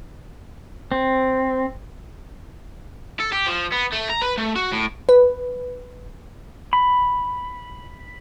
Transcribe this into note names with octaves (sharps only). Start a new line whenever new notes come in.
C4
A4
G4
F3
B3
A3
A#5
B4
A3
F#4
A2
B4
B5